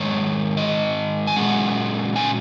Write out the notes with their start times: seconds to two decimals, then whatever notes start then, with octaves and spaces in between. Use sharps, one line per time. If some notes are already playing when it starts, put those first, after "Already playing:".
Already playing: G#2 D#3 G#3 C#5
0.57 D#5
1.27 G#5
1.36 A#2 G#3 C#4 F#5
2.16 G#5